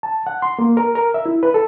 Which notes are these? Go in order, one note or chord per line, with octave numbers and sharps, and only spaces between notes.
A5
F#5
C6
A#3
A#4
A#4
E5
E4
B4
A4